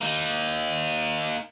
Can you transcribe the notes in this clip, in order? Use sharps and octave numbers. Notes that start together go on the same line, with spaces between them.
A#3 D#4